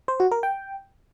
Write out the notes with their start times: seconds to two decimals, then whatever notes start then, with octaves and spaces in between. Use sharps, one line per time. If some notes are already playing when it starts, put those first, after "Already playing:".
0.08 C5
0.20 F#4
0.31 A#4
0.43 G5